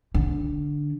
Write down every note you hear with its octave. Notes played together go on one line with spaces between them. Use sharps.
D3